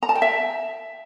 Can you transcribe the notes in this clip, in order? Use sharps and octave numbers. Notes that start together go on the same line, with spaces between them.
A#5
A5
G5
E5